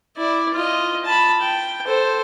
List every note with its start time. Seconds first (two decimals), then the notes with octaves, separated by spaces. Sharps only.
0.17 E4 D5
0.54 F4 D#5
1.05 A5 B5
1.42 G5
1.87 A4 C5